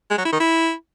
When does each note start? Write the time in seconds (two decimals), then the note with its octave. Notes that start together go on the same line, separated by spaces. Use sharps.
0.10 G#3
0.18 F#3
0.25 E4
0.33 D#3
0.40 E4